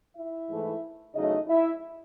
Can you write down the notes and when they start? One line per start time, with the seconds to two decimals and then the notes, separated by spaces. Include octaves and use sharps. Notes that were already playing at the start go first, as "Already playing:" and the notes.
0.16 E4 E5
0.48 G#2 E3 A3
1.14 E2 C#3 F#3 A3 D#4 D#5
1.48 E4 E5